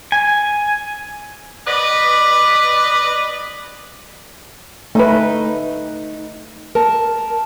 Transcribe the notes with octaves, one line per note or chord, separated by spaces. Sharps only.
G#5
B4 D5 D#5
A3 D#4 B4
A#4 A5